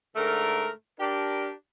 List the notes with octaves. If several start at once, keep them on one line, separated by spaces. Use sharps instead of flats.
G#2 D3 A3 A#4
D4 G4 A#4